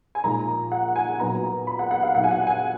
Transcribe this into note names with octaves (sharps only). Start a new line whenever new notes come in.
G#5
A#2 F3 G#3 D#4 A#5
F#5
G#5
A#2 F#3 B3 D#4 A#5
B5
F#5
F#5
F5
A#2 F#3 B3 D#4 F#5
G#5
F#5
G#5